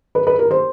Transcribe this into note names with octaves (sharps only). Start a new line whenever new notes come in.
B4
B4
A#4
C5